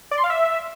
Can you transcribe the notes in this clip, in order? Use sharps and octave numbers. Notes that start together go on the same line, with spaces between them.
D5
C6
F5
E5